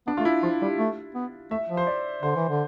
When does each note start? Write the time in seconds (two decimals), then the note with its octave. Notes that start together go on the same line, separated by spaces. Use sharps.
0.07 B3 D4
0.17 A3 F4
0.25 E4
0.43 F3 F4
0.62 G3 G4
0.79 A3
1.15 B3
1.51 A3 E5
1.69 F3
1.77 C5
1.87 D5
2.23 D3 C5
2.36 E3
2.49 D3